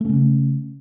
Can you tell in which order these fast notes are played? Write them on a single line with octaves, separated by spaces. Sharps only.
A3 C#4 C#3